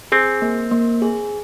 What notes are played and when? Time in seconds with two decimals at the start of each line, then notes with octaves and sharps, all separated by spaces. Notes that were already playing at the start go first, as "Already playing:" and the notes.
0.12 C4 G#4
0.42 A#3
0.71 A#3
1.02 G#4